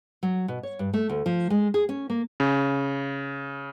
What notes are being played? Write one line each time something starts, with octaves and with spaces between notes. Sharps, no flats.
F#3
B2
C#5
G2
A3
D2
F3
G#3
G#4
C#4
A#3
C#3